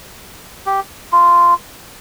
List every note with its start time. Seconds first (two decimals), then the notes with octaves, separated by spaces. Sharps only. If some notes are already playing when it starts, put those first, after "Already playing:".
0.66 G4
1.12 F4